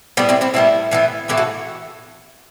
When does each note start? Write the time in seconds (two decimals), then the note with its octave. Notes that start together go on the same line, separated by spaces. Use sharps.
0.17 A2 G3 B3 D4
0.29 C4 E4
0.41 C4 E4
0.54 A2 G3 B3 C4 E4
0.91 A2 E3 B3
1.28 A2 E3 B3 E4 G4
1.37 F#4 A4